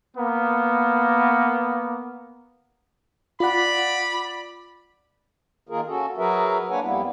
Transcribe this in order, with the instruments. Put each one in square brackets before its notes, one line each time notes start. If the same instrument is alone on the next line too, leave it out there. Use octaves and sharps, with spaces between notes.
[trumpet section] A#3 B3
[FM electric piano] F4 F#5 [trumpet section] D5 B5
[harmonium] D#3 A#3 F4 G#4 A#4
C#4 F#4 A4
F#3 F#4 G#4 A#4 B4 E5
A#3 D4 B4 C#5 F#5 G#5
F2 G3 A#3 B3 E4